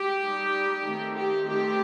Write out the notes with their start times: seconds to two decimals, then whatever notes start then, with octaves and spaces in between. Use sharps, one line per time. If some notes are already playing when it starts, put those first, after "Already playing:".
Already playing: G4
0.20 G3 D#4
0.84 D#3 A3 C4 D#4
1.15 G4
1.46 D#3 A3 C4 G4